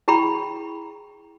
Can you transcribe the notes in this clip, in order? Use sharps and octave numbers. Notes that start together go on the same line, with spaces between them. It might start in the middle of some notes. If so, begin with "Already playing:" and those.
E4 G#4 G5 A#5 B5 C#6